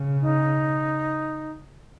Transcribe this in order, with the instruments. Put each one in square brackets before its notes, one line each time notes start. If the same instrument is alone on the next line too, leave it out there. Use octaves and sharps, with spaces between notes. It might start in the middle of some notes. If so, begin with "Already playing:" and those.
Already playing: [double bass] C#3
[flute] D#4